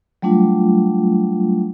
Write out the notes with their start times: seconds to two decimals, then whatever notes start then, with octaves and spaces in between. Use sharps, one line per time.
0.22 F#3 G3 A3 D4 F4